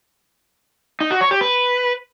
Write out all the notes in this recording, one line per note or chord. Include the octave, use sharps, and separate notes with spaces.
D#4
F#4
C#5
G4
B4